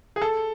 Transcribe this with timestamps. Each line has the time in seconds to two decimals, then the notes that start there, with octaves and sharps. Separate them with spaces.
0.16 G#4
0.22 A4